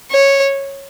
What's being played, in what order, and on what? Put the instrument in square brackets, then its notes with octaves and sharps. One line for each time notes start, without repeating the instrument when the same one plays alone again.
[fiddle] C#5